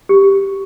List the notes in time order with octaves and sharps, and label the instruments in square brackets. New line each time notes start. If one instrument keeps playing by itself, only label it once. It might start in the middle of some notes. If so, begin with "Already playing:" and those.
[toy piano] G4